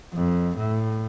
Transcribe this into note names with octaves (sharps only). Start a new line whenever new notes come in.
F2
A2